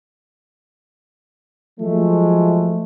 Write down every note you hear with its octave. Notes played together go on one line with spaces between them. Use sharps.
F3 F#3 G#3 A3